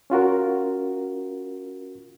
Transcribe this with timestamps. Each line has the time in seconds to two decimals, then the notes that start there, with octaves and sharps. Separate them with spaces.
0.10 C#4 F4 F#4 A#4